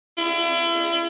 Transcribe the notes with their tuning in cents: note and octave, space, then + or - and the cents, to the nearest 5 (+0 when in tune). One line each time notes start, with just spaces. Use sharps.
E4 +40